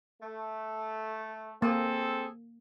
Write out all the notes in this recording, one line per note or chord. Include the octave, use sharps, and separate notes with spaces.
A3
A#3 C4 G#4 A4